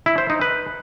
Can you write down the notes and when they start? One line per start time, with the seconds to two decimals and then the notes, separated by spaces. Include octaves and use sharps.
0.06 E4
0.18 C5
0.30 D#4
0.41 B4